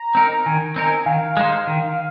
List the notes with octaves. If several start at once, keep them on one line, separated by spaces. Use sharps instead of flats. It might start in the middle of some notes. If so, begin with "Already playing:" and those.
Already playing: A#5
C4 D#4 A#4
D#3 G#5
C4 D#4 A#4
D#3 F5
G#3 D#4 C5
D#3